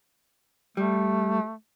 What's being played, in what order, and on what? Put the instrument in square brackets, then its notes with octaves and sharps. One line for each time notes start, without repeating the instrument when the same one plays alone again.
[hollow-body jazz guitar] G3 [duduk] A3